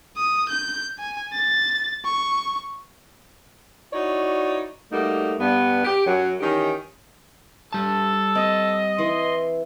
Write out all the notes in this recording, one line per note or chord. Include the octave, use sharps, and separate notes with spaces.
D#6
G6
G#5
A6
C#6
D#4 E4 F#4 C#5 D5
G3 A3 A#3 D#4 F#4
G2 B3
G4
F#2 F#3
D#3 E3 C#4 D#4 G4
G3 A4 A5
C4 D#5
E3 C6